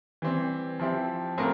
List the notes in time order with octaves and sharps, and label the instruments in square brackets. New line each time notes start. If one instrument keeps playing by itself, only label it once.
[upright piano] E3 G3 C4
F3 C4 E4 G4
A2 C4 F4 A#4